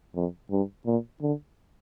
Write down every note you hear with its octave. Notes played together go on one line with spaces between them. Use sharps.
F2
G2
A#2
D3